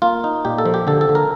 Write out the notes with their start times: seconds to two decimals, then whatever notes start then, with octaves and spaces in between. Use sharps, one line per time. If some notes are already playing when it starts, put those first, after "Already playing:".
0.02 A#3 F4
0.24 D#4
0.45 A#2 G4
0.58 A4
0.66 F3
0.74 G4
0.87 D3 A4
1.01 A4
1.09 D3
1.15 A#4